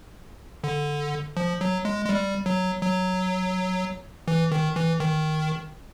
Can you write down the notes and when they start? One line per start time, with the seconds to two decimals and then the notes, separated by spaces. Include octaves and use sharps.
0.64 D3
1.37 F3
1.61 F#3
1.85 G#3
2.05 G#3
2.09 G3
2.46 F#3
2.82 F#3
4.28 E3
4.52 D#3
4.76 E3
5.00 D#3